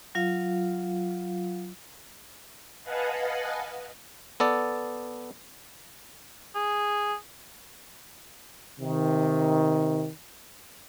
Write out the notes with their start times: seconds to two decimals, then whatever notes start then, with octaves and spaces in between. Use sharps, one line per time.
0.15 F#3 F4 F5
2.83 B4 D#5 F5 F#5 G#5 A5
4.40 B3 A4 D5
6.55 G#4
8.80 C3 D#3